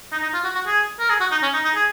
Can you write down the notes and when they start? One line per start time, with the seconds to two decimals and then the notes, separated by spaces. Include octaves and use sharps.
0.12 D#4
0.23 D#4
0.34 F4
0.44 F#4
0.55 F#4
0.67 G#4
1.00 A#4
1.10 G#4
1.20 F#4
1.31 D#4
1.43 C#4
1.54 D#4
1.64 D#4
1.75 G#4